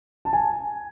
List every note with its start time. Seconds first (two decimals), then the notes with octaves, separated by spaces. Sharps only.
0.25 A5
0.33 G#5